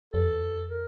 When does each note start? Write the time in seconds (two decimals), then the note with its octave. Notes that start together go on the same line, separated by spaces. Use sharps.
0.13 F2 A4
0.27 E2
0.42 F2
0.69 A#4